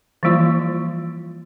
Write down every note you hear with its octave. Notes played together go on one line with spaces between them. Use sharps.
E3 F3 G3 A#3 E4 F4